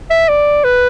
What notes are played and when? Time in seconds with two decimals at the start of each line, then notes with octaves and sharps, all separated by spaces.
0.11 E5
0.29 D5
0.64 B4